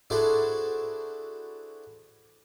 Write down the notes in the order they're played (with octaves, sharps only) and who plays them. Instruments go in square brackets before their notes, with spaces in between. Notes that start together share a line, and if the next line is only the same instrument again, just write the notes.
[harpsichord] D4 E4 F#4 G#4 A4 C5